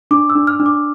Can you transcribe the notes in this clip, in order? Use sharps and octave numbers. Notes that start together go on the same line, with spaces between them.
D4 D6
E6
D4
F6
D4
D6